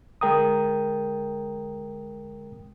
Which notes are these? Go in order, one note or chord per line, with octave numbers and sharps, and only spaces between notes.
D3 G#3 A#4 G5 A#5 D#6